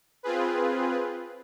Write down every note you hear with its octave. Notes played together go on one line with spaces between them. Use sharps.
C4 F4 G#4 B4